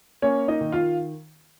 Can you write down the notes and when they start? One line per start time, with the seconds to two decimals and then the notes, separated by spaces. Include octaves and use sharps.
0.22 A#3 C#4 C#5
0.48 D#4 D#5
0.61 D#3
0.72 F4 F5